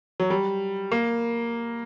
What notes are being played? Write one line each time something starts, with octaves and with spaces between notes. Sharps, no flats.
F#3
G3
A#3